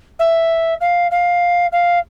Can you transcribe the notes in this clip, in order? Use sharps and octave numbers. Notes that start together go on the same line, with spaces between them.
E5
F5
F5
F5